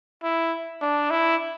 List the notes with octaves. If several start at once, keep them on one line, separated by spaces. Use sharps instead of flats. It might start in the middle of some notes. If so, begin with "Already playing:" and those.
E4
D4
E4